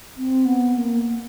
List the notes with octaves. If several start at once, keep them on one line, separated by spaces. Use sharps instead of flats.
C4
B3
A#3